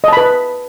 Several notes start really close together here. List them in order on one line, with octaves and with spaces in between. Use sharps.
D#5 A5 B5 B4